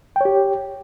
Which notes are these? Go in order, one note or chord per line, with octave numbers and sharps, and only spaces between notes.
G4 C#5 G5